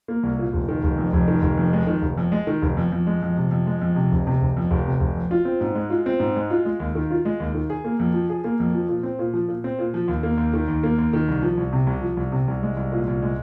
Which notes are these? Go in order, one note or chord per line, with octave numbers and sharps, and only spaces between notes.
A#3
C2
A#2
F1
D#3
F1
F2
F1
D#3
F1
F2
G#3
D#3
F1
F2
G#3
D#3
F1
F2
F2
G#3
F2
C3
F2
G#3
F2
C3
F1
C3
F1
F2
F1
C3
F1
F2
F4
C4
G#2
G#3
F4
C4
G#2
G#3
F4
G#3
D#2
D#3
F4
G#3
D#2
D#3
G#4
A#3
F2
F3
G#4
A#3
F2
F3
A#2
C4
A#2
F3
A#2
C4
A#2
F3
D#2
A#3
D#2
D#3
D#2
A#3
D#2
D#3
C2
F3
C2
C3
C2
F3
C2
C3
C2
G#3
C2
A#2
C2
G#3